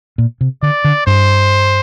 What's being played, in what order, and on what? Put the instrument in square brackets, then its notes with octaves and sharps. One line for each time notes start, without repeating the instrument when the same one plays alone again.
[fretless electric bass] A#2
C3
[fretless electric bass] D3 [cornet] D5
[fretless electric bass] D3
[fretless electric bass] G2 [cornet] C5